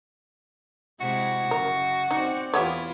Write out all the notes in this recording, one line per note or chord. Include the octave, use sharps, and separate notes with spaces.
C3 G#3 E4 F#4
F#2 C#3 A#4
C4 D#4 D5
E2 G3 B3 E4 F4 C#5